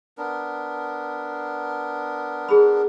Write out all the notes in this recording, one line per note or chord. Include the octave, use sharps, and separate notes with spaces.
B3 D4 A#4
G#4 B5